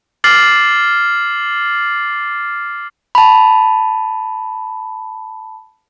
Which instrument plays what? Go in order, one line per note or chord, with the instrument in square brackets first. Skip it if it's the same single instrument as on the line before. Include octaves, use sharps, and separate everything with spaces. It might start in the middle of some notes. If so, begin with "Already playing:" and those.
[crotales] D6 F6 A6 C7 F#7
[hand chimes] A5 B5